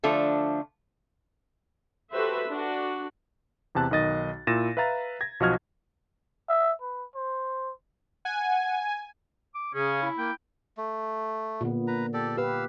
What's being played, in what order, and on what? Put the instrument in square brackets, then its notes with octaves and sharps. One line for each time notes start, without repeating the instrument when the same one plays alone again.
[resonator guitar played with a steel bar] D3 F3 A3 D4
[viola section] F#4 G4 A4 B4 C5 E5
D4 F#4
[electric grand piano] E2 C3 A5 F#6
B1 D#3 D#5 A6
A#2 E4 A6 A#6 D#7 E7
B4 E5 F5 A#5 A6
G#6 A#6
B1 F3 F#4 D#5 F6 G#6
[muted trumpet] E5
B4
C5
[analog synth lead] F#5 [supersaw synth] G#5
[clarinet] D6
[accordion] C#3 [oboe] C#4 [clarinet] G#4
[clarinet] E4
[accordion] A#3 [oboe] G5
[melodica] A3
[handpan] A#2 D3 B3
[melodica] B4 A#5
G4 A4 D5
[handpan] G4 B4 [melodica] F5 E6